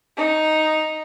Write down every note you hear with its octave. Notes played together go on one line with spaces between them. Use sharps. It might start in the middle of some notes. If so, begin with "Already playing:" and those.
D#4